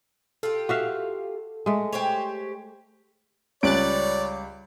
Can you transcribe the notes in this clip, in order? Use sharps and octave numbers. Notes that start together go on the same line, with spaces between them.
F4 G4 A4
F#4 E5 F5
G#3 A3
G4 C5 C#5
C#2 G3 C#4 C#5 D5 F#6 A6 D7